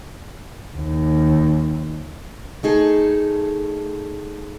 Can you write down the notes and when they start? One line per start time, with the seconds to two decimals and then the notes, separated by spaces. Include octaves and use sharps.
0.77 D#2
2.63 A3 D#4 G#4 A4